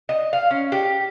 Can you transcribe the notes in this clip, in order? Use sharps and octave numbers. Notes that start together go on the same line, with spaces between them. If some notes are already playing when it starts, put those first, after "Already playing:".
D#5
F5
C#4
G4